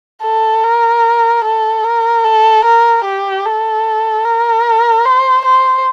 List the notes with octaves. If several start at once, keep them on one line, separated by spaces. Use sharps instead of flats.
A4
A#4
A4
A#4
A4
A#4
G4
A4
A#4
C5
C5